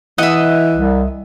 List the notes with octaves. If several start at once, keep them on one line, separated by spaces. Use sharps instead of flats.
E3 D#5 E5 F#5
C2